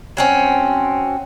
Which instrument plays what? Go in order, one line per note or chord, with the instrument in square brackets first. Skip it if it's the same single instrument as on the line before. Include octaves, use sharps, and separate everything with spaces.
[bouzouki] F#3 C4 C#4